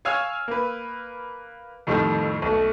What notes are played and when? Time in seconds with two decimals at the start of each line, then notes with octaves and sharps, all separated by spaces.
0.05 C#5 F5 G#5 E6 F6 G#6
0.48 A#3 B4
1.87 F2 A2 D#3 F3 G3
2.42 B1 A3